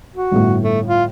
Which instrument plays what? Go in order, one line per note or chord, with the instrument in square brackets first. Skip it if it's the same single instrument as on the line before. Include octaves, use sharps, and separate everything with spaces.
[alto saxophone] F#4
[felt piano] G1 A2
[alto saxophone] A3
F4